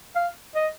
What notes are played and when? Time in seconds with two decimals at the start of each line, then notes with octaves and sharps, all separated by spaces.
0.16 F5
0.56 D#5